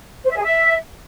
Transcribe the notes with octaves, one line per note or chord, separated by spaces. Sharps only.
C5
E5
G#4
E5